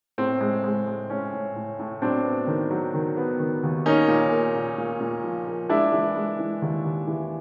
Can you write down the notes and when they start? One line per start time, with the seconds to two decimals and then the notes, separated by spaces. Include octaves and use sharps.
0.18 A2 C4
0.40 G#3
0.64 G#3
0.87 G#3
1.10 A2 C#4
1.33 A2
1.56 A2
1.79 A2
2.02 F#3 C4 D4
2.24 B3
2.47 D#3
2.71 F#3
2.94 D#3
3.17 B3
3.40 D#3
3.63 D#2
3.86 A#3 C#4 D#4
4.08 A#2
4.32 A#3
4.55 A#2
4.78 A#2
5.01 A#2
5.24 F3
5.47 A#3
5.69 G#3 D4 E4
5.93 E3
6.16 G#3
6.39 E3
6.62 D#2
6.85 D#2
7.08 E3